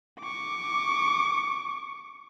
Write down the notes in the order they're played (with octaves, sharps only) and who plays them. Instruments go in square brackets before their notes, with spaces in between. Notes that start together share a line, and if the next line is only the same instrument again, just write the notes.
[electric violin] C#6 D6